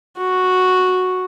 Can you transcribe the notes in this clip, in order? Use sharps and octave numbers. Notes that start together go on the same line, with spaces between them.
F#4